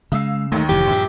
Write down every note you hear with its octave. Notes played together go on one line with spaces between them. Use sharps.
C#3 G#3 F5 E6 C7
D#2 D#3 A3
F1 B1 E3 G4
A#1 G2 A#2